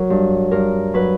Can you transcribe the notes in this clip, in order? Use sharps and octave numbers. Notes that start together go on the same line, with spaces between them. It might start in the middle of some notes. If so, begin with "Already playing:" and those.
Already playing: F#3 A#4
G2
G2 A#4
F#3 B4